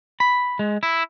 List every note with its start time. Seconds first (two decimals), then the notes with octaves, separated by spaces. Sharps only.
0.20 B5
0.59 G#3
0.83 E4